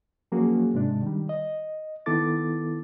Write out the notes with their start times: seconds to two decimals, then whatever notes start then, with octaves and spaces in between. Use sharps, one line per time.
0.32 F3 F#3 A#3 C#4 F#4 G#4
0.74 G#2 C3 G#3 D4
1.03 D#3 G3
1.29 D#5
2.06 D#3 B3 E4 A4 D6 A6